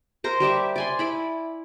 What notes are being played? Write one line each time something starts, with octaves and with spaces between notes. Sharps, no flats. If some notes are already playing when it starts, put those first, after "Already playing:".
A#4 C5 A#5
G3 G4 E5 D6
D5 G#5 C6
E4 B5 D6